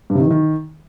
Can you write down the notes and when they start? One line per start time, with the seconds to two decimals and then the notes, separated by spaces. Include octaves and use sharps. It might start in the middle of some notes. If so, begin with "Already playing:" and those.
0.10 G2
0.15 C3
0.20 D#3
0.25 E3
0.31 D#3